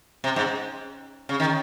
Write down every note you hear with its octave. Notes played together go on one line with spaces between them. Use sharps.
C3
G#2
C#3
D#3